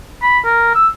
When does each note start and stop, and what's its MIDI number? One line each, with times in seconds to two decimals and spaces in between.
0.22 0.39 83
0.45 0.69 70
0.75 0.87 88